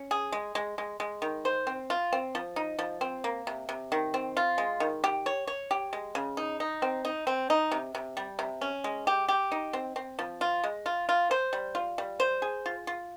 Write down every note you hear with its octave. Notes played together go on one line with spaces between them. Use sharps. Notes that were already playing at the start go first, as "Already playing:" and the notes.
Already playing: C#4
G#4
G#3
G#3
G#3
G#3
D#3
C5
C4
F4
C4
F3
D#4
F3
C4
A#3
C3
C3
D#3
C4
F4
G#3
D#3
G4
C#5
C#5
G4
G#3
C#3
D#4
D#4
C4
D#4
C4
D#4
C3
C3
G3
C3
C#4
G#3
G4
G4
D#4
C4
C4
F3
F4
G#3
F4
F4
C5
G3
F4
G3
C5
G#4
F4
F4